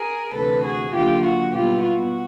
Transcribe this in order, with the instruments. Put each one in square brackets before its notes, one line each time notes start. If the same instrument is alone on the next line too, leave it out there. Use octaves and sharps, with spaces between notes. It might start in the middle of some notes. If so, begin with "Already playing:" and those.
Already playing: [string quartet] G#4 A#4
D2 C3 E3 A3 A4 B4
F#4 G#4
D#2 D3 F#3 A#3 F4 G4
F#4
B2 G3 B3 E4 F4 G4
F#4